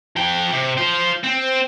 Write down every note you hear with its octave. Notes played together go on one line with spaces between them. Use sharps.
F3 G5
C3
F4 C5
C4